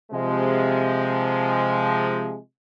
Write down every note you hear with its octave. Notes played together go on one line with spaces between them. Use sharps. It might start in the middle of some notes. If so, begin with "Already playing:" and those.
C3 F3 G#3